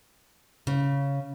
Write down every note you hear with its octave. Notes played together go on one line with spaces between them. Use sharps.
C#3